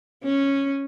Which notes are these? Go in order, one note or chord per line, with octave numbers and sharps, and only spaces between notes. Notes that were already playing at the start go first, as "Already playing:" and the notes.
C#4